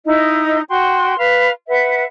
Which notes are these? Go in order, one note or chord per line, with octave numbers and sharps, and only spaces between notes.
D#4 E4 D#5
F#4 G5 C6
B4 F5
B4 E5 F#5